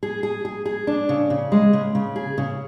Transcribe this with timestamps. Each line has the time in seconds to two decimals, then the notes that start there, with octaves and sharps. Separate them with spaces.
0.03 G#4
0.23 G#4
0.45 G#4
0.66 G#4
0.87 D4
1.09 C#3
1.30 C#3
1.52 G#3
1.73 C#3
1.95 C#3
2.16 G#4
2.38 C#3